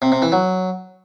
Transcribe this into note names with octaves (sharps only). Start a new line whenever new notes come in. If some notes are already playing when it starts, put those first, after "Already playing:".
C3
C3
E3
F#3